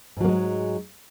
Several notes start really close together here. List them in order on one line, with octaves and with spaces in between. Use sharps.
G#2 F#3 A#3 G#3